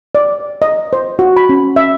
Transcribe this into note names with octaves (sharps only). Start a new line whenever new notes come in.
D5
D#5
C5
F#4
B5
C#4
E5